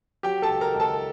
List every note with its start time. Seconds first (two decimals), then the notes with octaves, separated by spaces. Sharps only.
0.23 F#3 G4 G5
0.42 A4 A5
0.49 C#2
0.61 A#4 A#5
0.74 C#2
0.80 A4 A5